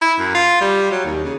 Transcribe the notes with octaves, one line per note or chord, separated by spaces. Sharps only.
E4
F#2
F4
G3
F#3
D#2
C#3